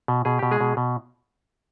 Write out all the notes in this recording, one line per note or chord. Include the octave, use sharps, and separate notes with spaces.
B2
B2 G#4
B2 G4
G#3 G#4
B2
B2